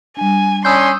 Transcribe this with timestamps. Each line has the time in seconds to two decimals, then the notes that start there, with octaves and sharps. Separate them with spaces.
0.17 G3 D4 G#5
0.65 C#4 D4 G#5 B5 C6 D#6 E6 G6